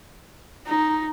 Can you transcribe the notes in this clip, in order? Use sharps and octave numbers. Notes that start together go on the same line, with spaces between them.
D#4